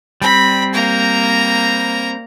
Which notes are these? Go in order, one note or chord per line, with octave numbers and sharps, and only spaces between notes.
G3 C4 B5
A#3 A#5